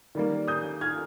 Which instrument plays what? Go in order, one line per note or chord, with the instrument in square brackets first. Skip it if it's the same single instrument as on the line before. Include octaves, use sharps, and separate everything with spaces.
[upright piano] D#3 G3 A#3
D#6 G6
F6 G#6